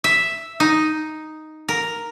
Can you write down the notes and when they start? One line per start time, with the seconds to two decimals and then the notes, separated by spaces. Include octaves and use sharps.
0.04 E5
0.60 D#4
1.69 A#4